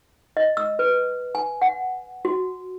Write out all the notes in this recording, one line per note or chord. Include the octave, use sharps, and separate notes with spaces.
D#5
E6
B4
G#5
F#5
F#4